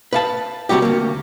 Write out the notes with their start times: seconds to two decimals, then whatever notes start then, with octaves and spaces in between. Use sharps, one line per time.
0.13 B4 F5 A5
0.69 C3 E3 G3 F#4 G4
0.82 D2 A#3